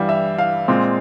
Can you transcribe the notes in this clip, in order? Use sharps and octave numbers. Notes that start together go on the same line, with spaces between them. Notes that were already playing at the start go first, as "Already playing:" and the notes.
Already playing: G2 E3 G3 F5
E5
F5
A#2 G#3 C4